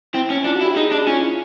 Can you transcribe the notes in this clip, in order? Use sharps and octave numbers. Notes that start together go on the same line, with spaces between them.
C4 E4
C#4
D4 F4
F#4
E4
G4
D#4 G#4
D4 G#4
C#4 F4
E4